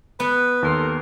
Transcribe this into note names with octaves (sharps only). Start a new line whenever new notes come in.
B3 B4
D#2 A4 A#4 C6